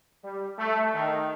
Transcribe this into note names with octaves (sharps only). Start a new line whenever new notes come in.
G3
A3
D#3